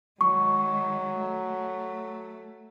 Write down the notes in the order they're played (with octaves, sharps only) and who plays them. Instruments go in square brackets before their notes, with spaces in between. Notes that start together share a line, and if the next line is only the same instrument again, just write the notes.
[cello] D#3 G#3 [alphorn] F#3 [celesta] C#6
[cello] A3